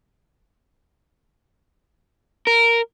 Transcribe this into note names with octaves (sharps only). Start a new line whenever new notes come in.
A#4